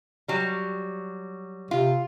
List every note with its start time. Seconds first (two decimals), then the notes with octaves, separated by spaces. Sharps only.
0.28 F#3 G3
1.71 C3 F4